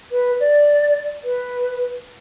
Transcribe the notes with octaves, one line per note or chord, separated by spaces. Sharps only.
B4
D5
B4